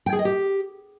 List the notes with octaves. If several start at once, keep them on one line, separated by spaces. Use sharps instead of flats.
G5
G#4
D#5
G4